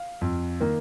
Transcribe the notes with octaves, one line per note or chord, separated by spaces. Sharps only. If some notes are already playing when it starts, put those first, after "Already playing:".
Already playing: F5
F2
D#3 A#3